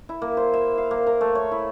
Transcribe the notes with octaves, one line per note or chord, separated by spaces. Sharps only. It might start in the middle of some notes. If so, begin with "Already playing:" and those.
E4
A#3
C5
E5
F5
A#3
A#4
A3
C#5
E4